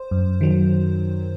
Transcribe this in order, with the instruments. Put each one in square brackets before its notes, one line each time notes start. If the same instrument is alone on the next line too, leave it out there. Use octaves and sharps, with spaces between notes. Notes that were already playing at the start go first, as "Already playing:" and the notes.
Already playing: [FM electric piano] C5
F#2
D#3 F#3